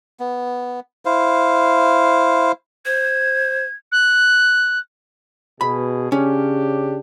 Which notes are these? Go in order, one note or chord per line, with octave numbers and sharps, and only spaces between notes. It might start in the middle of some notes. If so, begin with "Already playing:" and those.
B3
E4 C5 F5
C5 G#6
F#6
B2 G#4 B5
C#3 C#4 D4 G4